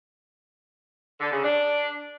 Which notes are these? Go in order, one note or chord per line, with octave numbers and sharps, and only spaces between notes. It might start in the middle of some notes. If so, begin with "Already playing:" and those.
D3
C#3
D4